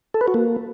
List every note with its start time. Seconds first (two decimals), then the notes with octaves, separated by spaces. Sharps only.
0.14 A4
0.21 B4
0.28 F#4
0.34 A#3